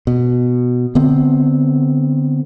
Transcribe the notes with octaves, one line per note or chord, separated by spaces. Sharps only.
B2
D3 B3 C4